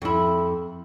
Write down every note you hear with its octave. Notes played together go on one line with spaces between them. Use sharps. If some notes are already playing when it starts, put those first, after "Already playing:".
F2 E4